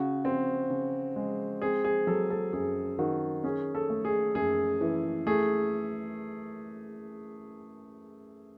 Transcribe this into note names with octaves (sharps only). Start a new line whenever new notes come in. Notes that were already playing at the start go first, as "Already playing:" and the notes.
Already playing: C#3 F#4
C4
C#3
G#3
C4 G#4
G#4
F#3 A4
A4
F#2 G#4
D#3 F#4
C#4 G#4
A4
A3
G#4
F#2 G#4
E3
A3 G#4